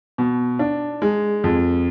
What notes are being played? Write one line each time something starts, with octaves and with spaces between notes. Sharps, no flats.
B2
D4
G#3
F2